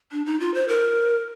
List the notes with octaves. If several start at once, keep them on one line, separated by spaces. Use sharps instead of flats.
D4
D#4
F4
C5
A#4